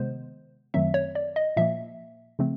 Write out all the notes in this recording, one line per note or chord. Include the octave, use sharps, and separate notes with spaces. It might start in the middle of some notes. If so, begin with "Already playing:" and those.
Already playing: C3 D#3 G#3 B3 C5
F#2 D#3 F#3 A3 C4 E5
C#5
D5
D#5
A#2 F3 A#3 E5
C#3 F3 A3 C4